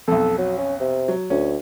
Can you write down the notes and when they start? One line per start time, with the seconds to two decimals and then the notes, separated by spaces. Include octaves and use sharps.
0.08 B1 F2 A4
0.38 F#3
0.58 C#4
0.80 C3
1.08 F#3
1.30 D2 C#4